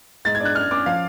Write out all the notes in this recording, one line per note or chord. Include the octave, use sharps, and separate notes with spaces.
G#2 A6
G#6
D4
F#6
F#2 F6
C#4 D6
F3 F5